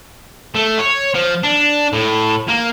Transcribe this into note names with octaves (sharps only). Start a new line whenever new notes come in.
A3
C#5
F3
D4
A2
A#3